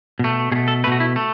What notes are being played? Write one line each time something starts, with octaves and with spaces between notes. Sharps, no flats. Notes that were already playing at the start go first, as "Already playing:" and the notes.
B2 A3
B2 A3 G#4
A4
B2 A3 F#4 B4
E4
A3